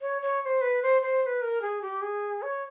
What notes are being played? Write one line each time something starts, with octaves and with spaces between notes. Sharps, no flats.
C#5
C#5
C#5
C5
B4
C5
C5
C5
B4
A#4
G#4
G4
G#4
C#5